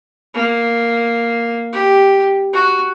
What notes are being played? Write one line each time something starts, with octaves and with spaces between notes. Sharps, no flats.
A#3
G4
F#4